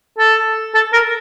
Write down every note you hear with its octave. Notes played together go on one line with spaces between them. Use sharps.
A4
A4
A#4